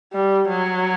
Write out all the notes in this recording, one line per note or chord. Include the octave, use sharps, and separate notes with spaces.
G3
F#3